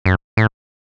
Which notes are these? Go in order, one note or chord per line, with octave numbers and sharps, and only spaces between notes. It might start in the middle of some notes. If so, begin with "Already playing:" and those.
F#2
A2